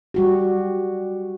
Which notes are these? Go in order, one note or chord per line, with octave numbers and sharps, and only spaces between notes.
G3 F#4 G4